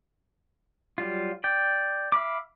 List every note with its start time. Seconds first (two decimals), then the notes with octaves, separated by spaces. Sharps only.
0.98 F#3 G3 F4
1.44 D5 G5
2.12 E5 F5 B5 D6